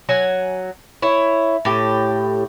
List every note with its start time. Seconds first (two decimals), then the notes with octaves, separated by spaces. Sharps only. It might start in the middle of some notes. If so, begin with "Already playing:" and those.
0.09 F#3 F#5 G#5
1.02 E4 C#5
1.65 A2 G4